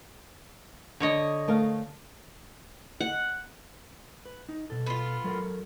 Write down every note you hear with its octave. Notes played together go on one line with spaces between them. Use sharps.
D3 C#5 D#5
A3 A#4 F5
F#5
B4
D#4
B2 A4
B3 F4
F#3 A4 A#4